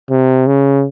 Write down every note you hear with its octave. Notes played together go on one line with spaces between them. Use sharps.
C3
C#3